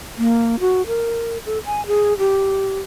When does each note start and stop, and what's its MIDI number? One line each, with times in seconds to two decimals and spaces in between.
0.18 0.60 58
0.60 0.86 66
0.87 1.38 70
1.46 1.59 69
1.66 1.85 80
1.87 2.17 68
2.19 2.79 67